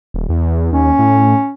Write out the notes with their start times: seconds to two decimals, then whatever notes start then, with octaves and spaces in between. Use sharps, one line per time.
0.14 D#1
0.29 E2
0.72 D#2 C#4
0.99 A2